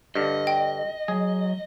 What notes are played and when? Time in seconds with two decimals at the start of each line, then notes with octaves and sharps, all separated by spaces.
0.15 G2 D3 D#5
0.47 G5
1.08 F#3 G#4